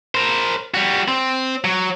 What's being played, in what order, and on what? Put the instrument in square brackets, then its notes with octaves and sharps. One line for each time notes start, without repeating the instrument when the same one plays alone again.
[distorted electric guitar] A#4 C5
G3 F#4
C4
F#3